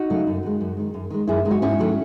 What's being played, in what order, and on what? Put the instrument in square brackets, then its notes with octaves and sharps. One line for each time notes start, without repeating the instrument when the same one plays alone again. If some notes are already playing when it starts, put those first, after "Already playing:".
Already playing: [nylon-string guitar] D#4 F#4
C#3 F#3 A3
F#2
D#3 G#3
F#2
D#3 G#3
F#2
D#3 G#3
F#2 E4 G#4
D#3 G#3
D#4 F#4
G#2 C#4 E4
D#3 F#3 A3